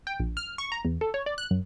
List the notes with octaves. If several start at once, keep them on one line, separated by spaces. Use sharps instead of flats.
G5
A#1
F6
C#6
A#5
E2
A4
C#5
D5
F#6
F#2